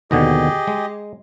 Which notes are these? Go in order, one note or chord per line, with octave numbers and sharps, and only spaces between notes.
D#2 B2 D3 G4 G#4 D#5
G#3